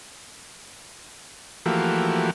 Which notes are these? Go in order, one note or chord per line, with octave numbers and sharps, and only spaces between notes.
E3 F3 A3 A#3 F#4 G4